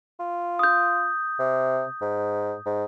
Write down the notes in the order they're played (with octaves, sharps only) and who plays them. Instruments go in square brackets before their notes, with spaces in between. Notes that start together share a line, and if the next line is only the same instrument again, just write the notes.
[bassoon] F4
[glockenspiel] D#6 G6
[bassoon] C3
G#2
G#2